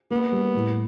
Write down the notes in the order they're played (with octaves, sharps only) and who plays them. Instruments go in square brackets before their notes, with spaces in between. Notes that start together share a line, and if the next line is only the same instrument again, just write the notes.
[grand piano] A#3 [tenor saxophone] B3
[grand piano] G3
A2